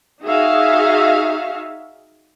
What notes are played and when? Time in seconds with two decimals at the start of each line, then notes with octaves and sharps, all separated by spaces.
0.23 D#4 F#4 G#4 E5 F5